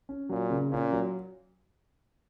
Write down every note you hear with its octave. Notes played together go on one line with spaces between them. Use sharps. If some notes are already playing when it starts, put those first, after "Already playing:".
C#4
A#2 F#3
C#3
A#2 C#4
F#3